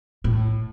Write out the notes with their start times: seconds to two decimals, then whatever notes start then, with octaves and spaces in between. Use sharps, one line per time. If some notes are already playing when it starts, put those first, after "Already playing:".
0.24 A2